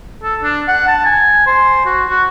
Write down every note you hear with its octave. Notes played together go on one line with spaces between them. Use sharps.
A4
D4
F#5
A5
G#5
C5
F#4
F#4